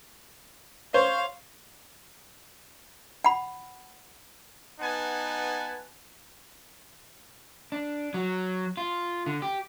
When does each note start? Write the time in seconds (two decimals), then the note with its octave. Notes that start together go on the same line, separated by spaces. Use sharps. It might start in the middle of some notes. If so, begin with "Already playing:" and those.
0.94 C5 C#5 F5
3.24 F#5 B5
4.80 B3 D#4 B4 F#5 G#5 A5
7.72 D4
8.14 F#3
8.77 F4
9.26 D3
9.42 G4